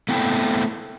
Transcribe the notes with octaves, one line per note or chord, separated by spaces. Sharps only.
A3 B3 C4 E4 G5